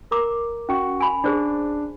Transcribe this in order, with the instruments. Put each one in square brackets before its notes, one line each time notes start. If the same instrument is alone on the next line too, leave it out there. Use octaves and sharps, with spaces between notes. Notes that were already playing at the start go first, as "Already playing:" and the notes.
[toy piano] A#4 A#5 D6
[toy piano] C#4 [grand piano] F#4 C#6
[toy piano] G#5 B5
[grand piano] D4 [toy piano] G#4 C5 D5